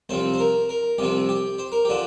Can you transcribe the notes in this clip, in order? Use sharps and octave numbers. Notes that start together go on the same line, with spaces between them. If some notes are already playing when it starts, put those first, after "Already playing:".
C2 C3 F3 C4 C5
C5
A#4
A#4
C2 C3 F3 C4 G4
G4
C5
A#4
D3 F3 D4 G4